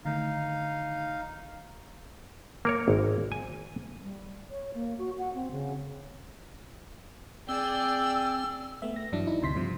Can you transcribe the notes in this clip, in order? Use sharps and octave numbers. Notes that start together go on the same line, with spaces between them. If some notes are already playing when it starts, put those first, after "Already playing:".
D3 D#3 A3 D#4 F5
A#3 A#4 C#5
G#1
G#5
G3
C#5
A#3
F#4
F#5
C4
C#3
C4 G#4 D5 G5 E6
A3 B3 E5
A#6
G2 E3 F#3 D4
D#4 E4
D2 C3 C6 B6
G2 C3 F3 G3